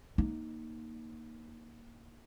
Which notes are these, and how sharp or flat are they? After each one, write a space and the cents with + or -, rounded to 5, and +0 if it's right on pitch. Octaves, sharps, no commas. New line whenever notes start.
A#3 +5 D#4 +0